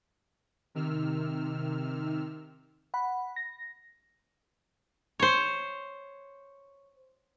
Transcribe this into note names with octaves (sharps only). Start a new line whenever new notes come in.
C3 D#3 E6 F6
F#5 B5
A#6
C5 C#5